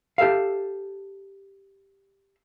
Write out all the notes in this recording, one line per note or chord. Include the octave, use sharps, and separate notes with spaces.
G4 A4 E5 F5